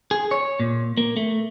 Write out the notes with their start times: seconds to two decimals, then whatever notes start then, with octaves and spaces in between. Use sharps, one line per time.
0.11 G#4
0.31 C#5
0.60 A#2
0.97 A#3
1.17 A3